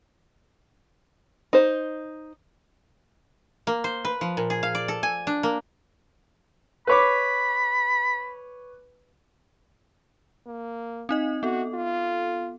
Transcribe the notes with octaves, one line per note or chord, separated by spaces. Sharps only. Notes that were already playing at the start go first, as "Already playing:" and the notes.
D#4 C5
A#3
C5
B4
F3
A#2
G#4
F5
D5
A4
G#5
D4
A#3
B4 C#5 B5 D6
A#3
C4 D#4 D#5
B3 F#4 A4
F4